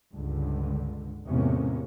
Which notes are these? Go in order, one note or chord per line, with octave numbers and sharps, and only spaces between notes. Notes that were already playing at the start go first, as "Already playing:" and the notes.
C#2 G2 D3
E2 A2 C3 G#3 A#3 C#4